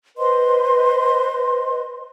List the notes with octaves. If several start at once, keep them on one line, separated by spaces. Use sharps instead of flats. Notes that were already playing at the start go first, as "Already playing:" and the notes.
B4 C5 D#5 C6